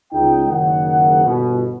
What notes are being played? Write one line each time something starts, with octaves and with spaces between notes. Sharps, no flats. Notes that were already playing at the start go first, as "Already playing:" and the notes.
C#2 D#4 G5
F#1 D#3 F#5
G1 B2